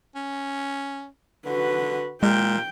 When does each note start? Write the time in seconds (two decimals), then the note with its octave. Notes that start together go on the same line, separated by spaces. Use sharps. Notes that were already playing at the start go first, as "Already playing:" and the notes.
0.15 C#4
1.46 D3 F#4 B4
2.23 A#2 G#3 G5